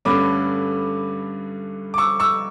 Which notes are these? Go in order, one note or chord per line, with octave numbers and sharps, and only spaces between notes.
G2 D3 A3 C#4 B5 D6
D6
C#6 E6
C#6 E6